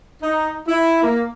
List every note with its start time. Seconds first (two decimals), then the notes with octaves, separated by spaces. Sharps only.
0.23 D#4
0.68 E4
1.03 A#3